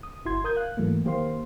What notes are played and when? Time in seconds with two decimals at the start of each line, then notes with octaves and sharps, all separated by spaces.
0.03 D#6
0.25 G1 E4 F#4 C6 G#6
0.44 A#4 D#6 G6 G#6
0.56 F5 F#6
0.77 G#2 E3 F#3 A3 A#3
1.05 D#3 A#3 G4 C5 F5 C6